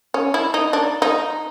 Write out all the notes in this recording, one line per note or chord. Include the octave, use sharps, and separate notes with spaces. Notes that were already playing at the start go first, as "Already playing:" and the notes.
C#4
E4
D#4
D4
D#4